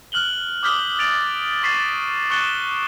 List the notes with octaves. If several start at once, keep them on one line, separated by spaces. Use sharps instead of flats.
F6 F#6 F#7 G7
D6 D#6 F6 G6 B6 G7
A6 D7 F7
C#6 A6 B6 C7 D#7 E7
C#6 F#6 A6 C#7 E7 G7